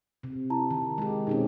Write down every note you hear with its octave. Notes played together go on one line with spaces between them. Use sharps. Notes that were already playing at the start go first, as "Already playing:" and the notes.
C3
E4 A5 A#5
D#3
G#3 G4
B2 C4 C#4 D#4 G4 G#4